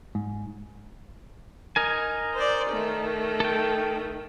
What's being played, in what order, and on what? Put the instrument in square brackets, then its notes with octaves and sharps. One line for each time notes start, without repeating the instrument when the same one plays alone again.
[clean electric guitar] G#2
[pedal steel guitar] D#4 A#4 G#5
[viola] C5 D5
D#3 A3
[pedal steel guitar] A4 G5